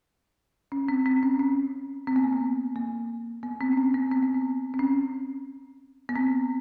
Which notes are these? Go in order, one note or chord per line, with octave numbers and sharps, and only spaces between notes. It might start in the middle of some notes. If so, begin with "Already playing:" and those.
C#4
C4
C4
C#4
C#4
C4
B3
A#3
B3
A#3
B3
C4
C#4
C4
B3
C4
B3
C4
C4
C#4
B3
C4